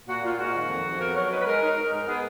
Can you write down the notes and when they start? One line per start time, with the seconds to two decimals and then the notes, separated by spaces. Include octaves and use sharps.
0.07 A#2 F#4
0.23 A#2 F4
0.38 G#2 F#4
0.54 D#3
0.69 F2
0.84 F2
1.00 B3 A#4
1.15 F#3 C#5
1.30 D#4 B4
1.41 B4
1.46 G#3 A#4
1.62 D#4
1.76 D#4
1.92 G#2 A#4
2.07 B3 G#4